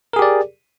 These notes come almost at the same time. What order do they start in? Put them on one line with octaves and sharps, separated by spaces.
A#4 G#4 G4 D5